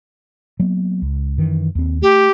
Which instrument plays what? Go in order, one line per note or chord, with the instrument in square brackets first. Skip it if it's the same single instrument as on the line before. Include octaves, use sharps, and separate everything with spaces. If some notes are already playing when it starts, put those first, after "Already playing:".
[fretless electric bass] F#3 A#3 B3
C#2
F#2 D#3 E3
D#2 C4
[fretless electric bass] A3 [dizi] G4